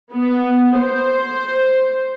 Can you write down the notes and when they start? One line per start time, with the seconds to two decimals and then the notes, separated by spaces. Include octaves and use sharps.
0.13 B3
0.78 C5